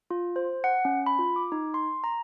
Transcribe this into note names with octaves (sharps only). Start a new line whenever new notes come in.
F4
C5
F#5
C#4
B5
F4
D6
D#4
C6
A#5